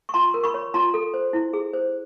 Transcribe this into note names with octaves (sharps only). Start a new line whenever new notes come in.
C#6
F4 A#5 C6
A#4
B5 C#6
C#5
F4 A#5 C6
A4
C5
E4
G#4
C5